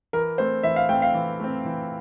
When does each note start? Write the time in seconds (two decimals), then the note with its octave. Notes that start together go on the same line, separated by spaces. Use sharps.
0.13 E3 A#4
0.38 A3 C4 C5
0.63 E3 E5
0.76 F5
0.89 A3 G5
0.92 C4
1.02 F5
1.14 E3
1.40 A3 C4
1.65 E3